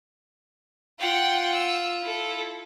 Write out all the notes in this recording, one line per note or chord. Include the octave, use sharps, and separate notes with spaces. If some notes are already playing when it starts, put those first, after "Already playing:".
F4 F#5 G5
E6
E4 A4